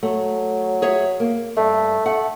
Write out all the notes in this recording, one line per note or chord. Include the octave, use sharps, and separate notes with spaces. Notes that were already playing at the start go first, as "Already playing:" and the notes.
F#3 A3
G#4 C#5 E5
A#3
G2 A3
A3 F#5